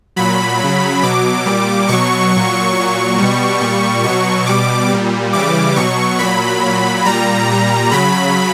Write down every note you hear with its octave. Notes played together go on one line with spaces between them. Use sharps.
A#2 F#3 B5
C#3 F#3
B2 F#3 D6
A#2 G3
B2 F#3 C#6
A#2 F#3
A#2 F#3 C#6
B2 G3
A#2 G3
B2 F#3 C#6
B2 G3 D6
A#2 G3
C#3 E3 G3 D6
B2 F#3 C#6
A#2 F#3 B5
A#2 F#3
A#2 G3 A#5
A#2 G3
C#3 F#3 B5